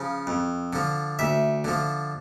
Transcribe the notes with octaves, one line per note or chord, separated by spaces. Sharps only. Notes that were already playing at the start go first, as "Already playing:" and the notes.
Already playing: C#3 F3
F2
D3 F3
D2 E5
D3 F3